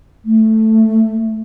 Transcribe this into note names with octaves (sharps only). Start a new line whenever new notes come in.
A3